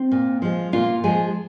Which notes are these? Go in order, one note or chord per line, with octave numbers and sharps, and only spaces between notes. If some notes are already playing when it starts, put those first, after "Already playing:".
Already playing: C4
A#2
F3 G#3
A#2 F4
F3 G#3 G#4